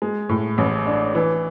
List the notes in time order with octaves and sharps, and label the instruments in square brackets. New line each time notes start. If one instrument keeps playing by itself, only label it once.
[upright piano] G#3
A2
A1
D4
E3